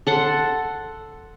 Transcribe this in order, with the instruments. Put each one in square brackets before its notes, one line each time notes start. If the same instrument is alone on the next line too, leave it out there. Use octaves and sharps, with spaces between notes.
[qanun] A4 F#5 C6